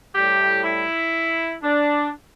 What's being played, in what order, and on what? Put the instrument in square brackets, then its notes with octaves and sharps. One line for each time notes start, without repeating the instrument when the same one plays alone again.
[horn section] A2 G3 G4
E4
D4